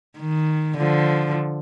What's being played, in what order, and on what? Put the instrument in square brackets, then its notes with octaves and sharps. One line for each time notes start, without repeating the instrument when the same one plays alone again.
[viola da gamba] D#3
D3 F3